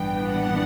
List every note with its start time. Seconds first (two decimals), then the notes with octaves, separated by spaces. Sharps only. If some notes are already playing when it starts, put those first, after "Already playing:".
Already playing: A1 G2 E3 B3 D4 G5
0.30 F#5